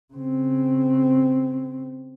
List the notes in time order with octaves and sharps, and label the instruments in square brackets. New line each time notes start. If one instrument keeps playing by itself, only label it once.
[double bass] C#3 C4